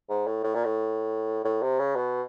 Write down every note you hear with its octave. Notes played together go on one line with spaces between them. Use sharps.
G#2
A2
A2
A#2
A2
A2
C3
C#3
B2